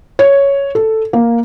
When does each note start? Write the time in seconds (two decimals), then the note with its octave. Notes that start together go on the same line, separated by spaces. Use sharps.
0.19 C#5
0.75 A4
1.13 A#3